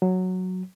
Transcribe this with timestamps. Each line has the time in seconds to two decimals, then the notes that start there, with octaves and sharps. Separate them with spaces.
0.02 F#3